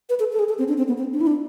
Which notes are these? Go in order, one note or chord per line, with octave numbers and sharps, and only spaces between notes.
B4
A4
A4
G#4
A4
C4
D4
C4
B3
C4
D4
E4
D4